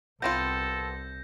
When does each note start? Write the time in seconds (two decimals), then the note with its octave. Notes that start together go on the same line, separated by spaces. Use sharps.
0.22 C2 B3 C4 F4 A4 G6 A#6